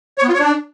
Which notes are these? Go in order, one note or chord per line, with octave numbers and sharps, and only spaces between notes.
C#5
B3
F4
C#5
D4